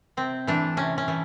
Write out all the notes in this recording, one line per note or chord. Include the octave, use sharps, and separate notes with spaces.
C3 C4
E3 A3 D4
C3 C#4
C#4
E3 A3